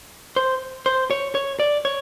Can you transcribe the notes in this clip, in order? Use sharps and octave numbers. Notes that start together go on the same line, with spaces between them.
C5
C5
C#5
C#5
D5
C#5